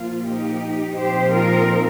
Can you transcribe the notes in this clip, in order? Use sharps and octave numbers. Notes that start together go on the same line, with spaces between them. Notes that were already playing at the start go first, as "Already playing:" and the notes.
Already playing: A#2 F3 A#3 F4
D#4 G4
A#2 F3 C4 D#4 G4 C5
F4 A#4